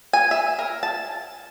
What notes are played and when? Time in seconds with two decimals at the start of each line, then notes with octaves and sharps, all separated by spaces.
0.13 G#5
0.31 E5
0.59 A#4
0.83 A5